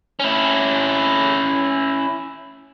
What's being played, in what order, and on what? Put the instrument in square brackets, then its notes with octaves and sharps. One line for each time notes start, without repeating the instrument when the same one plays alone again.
[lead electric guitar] C#4 E4